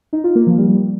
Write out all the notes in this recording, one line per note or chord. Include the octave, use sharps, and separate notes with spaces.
D#4
F4
A#3
F3
G3